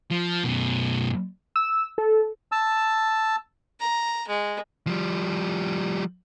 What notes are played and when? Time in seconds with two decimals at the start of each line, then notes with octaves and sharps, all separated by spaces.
0.11 F3
0.44 F#2 B2
1.56 E6
1.98 A4
2.52 A5 E6
3.80 A#5
4.27 G#3
4.87 F3 G3